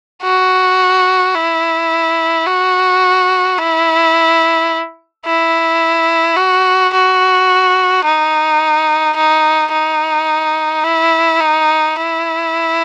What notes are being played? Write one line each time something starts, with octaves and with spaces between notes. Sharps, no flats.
F#4
E4
F#4
E4
E4
F#4
F#4
D#4
D#4
D#4
E4
D#4
E4